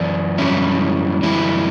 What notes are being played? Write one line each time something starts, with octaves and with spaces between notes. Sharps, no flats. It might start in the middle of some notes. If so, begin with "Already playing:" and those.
Already playing: F#2 E3 D5
F#2 E3 G3 C#4 E4
F#2 E3 G3 E4